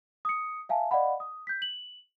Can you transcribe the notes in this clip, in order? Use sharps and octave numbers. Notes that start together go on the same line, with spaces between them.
D#6 C#7
E5 F5 G#5 A5
D5 D#5 F5 F#5 B5
D#6
G6 B6
F#7